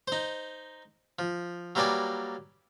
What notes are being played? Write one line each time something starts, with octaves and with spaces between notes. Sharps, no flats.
D#4 C5
F3
F#3 G3 A#3 B4 D5 G#5